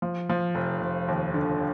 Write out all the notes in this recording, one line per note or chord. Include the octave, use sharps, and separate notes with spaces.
F3
F3
F1
F1
D#2
D3